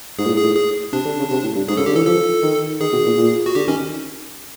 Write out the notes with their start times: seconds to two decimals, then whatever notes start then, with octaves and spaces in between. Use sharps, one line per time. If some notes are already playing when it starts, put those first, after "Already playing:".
0.18 G#2 G#4
0.27 A#2
0.31 A2
0.38 G#4
0.44 A2
0.56 G#4
0.93 C3 D4
1.05 D3
1.19 C#3
1.30 C3
1.44 A2
1.55 G2
1.68 G#2 G#4
1.77 C#3 A4
1.86 D3 G4
1.96 E3 A4
2.06 F3 A4
2.42 D#3
2.80 D#3 G#4
2.93 B2
3.05 A#2
3.18 A#2
3.46 F#4
3.55 D3 G4
3.68 D#3 C#4